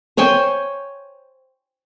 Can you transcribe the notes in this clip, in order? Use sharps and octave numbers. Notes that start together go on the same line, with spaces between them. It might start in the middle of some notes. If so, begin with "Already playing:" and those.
C5 C#5 G5 G#5